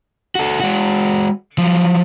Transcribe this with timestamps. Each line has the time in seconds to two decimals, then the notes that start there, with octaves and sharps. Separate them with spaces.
0.35 F#4 A4
0.60 G#3 F#4
1.58 F3 F#3